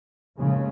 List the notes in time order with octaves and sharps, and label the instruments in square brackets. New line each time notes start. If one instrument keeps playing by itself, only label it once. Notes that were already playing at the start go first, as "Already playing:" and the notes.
[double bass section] D#2 C#3 G#3